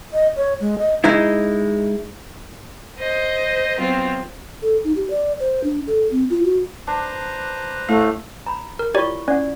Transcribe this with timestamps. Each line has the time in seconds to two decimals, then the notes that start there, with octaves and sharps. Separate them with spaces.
0.13 D#5
0.37 C#5
0.61 G#3
0.78 D#5
1.04 G#3 D#4 E4
2.98 C5 D#5
3.78 F#3 B3 C4 F4
4.62 A4
4.84 D#4
4.96 G4
5.10 D5
5.40 C5
5.64 D4
5.87 A4
6.11 C4
6.30 F4
6.44 F#4
6.87 D4 B4 C5 A#5
7.89 A2 A3 F5
8.46 A#5 B5
8.79 A#4
8.95 E4 F4 G4 C#5 D5 C#6
9.28 C#4 D5 F#5